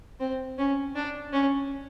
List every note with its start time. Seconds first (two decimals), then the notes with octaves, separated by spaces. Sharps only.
0.20 C4
0.58 C#4
0.95 D4
1.33 C#4